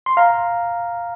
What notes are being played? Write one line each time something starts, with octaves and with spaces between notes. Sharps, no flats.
C6
F5 A#5